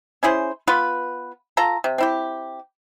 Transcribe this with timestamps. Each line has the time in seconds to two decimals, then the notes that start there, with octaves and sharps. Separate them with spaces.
0.23 C#4 E4 G#4 C5
0.68 B3 F4 B4
1.57 F4 A4 A#5
1.84 C3
1.98 C4 E4 G4